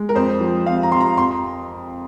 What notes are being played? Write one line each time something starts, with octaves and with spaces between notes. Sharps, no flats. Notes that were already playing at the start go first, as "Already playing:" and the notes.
Already playing: G#3
A#4
F2 C5
F3
F2 F5
A#5
F2 C6
A#5
F2 C6